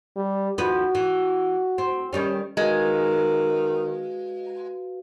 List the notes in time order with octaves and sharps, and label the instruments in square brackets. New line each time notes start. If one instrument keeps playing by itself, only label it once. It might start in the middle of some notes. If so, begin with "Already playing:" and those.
[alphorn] G3
[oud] D#2 F3 B4 [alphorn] F#4
[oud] E3
C4
D#3 G3 C#4
[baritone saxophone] D#3 [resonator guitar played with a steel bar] G#3 [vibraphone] F#4 B4 F5